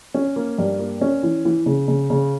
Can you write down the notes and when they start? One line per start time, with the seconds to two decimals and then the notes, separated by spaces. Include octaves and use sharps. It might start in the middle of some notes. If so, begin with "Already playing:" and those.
0.14 C#4
0.36 A#3
0.58 G2
0.79 A#3
1.01 C#4
1.23 E3
1.45 E3
1.66 C#3
1.88 C#3
2.10 C#3